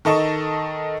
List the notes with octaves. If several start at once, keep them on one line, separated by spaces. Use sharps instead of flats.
D#3 A4 D#5 C#6 E7